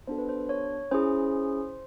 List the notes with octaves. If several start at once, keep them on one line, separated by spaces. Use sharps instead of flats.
B3 D4 F#4 A4 C5
B4
C5
C#5
C#4 E4 G#4 C5